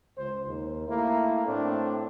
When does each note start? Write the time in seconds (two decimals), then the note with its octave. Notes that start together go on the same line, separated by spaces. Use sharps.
0.18 C#2 C5
0.48 D#2
0.89 A3 A#3 E4
1.46 A2 A3 C4 D4